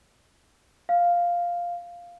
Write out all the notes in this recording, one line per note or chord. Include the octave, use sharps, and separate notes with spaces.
F5